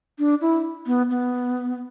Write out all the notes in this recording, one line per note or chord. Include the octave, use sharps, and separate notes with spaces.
D4
E4
B3
B3